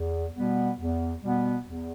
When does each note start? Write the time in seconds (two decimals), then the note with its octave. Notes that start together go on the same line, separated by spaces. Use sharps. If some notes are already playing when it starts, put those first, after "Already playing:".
Already playing: E2
0.35 B2 G3 B3
0.79 E2
1.23 B2 G3 B3
1.66 E2